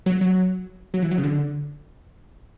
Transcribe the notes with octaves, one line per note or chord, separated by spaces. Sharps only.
F#3
F#3
F#3
E3
F#3
C#3
D3